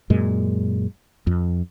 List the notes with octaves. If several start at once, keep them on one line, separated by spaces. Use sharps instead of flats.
F#2 A#2 G#3
F2